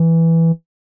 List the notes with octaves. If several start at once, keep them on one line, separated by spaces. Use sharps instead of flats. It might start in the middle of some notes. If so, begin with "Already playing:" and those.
Already playing: E3